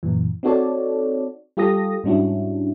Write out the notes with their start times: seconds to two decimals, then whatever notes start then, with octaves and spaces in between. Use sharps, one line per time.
0.03 F#2 A#2 E3
0.43 C4 D#4 F#4 A4 C#5 D5
1.57 G3 F4 G4 A4 D#6 A#6
2.04 G#2 G3 C#4 D4 E4 F#4